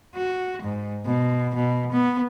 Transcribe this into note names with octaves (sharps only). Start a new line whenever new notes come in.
F#4
G#2
B2
B2
B3